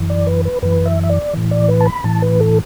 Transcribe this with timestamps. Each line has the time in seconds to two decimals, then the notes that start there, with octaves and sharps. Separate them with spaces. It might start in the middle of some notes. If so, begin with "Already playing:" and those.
Already playing: F#2 E3
0.10 D5
0.27 B4
0.45 B4
0.62 F#2 E3 B4
0.86 E5
1.03 E5
1.09 D5
1.33 A2 E3
1.51 D5
1.68 B4
1.81 A5
1.86 B5
2.04 A2 E3 A5
2.22 B4
2.40 A4